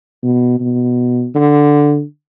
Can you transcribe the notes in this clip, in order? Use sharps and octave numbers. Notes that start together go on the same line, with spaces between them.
B2
B2
D3